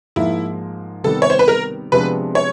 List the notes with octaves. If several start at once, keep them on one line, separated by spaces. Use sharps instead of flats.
G#2 F3 A#3 E4
C3 D#3 G3 B3 A4
C#5
C5
B4
A#4
C3 F3 G#3 B3 D4 B4
C#5